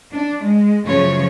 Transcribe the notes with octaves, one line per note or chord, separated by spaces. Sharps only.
D4
G#3
F#2 C#3 F3 A3 C#5